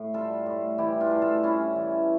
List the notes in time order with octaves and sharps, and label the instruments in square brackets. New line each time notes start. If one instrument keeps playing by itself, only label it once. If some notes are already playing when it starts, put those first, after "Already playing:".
Already playing: [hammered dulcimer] A2
G3 F4 A4
A2
E3 E4 G4
D4 F4
A2
F4 A4
G3 C#4 E4
E3